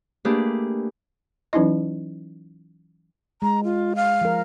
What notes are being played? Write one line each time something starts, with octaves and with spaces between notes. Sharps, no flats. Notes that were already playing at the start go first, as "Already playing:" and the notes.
A3 A#3 D4 G4 G#4 B4
E3 F#3 C#4 D#4 E4 D#5
G#3 A#5
F4
F5
F3 A#4